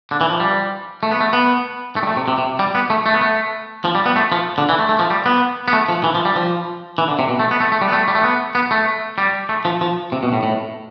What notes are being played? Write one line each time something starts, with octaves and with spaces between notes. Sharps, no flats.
D3
E3
F3
G3
A3
B3
A3
B3
A3
G3
A3
C3
C3
C3
G3
B3
A3
A3
B3
A3
F3
G3
B3
A3
F3
D3
E3
A3
A3
F3
G3
B3
B3
A3
F3
E3
F3
G3
F3
E3
D3
C3
B2
A3
B3
A3
A3
G3
B3
A3
G3
A3
B3
B3
A3
G3
A3
F3
F3
C3
B2
A2
A2